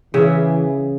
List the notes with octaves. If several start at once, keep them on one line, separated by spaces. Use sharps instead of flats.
C#3 E3 G#4 E5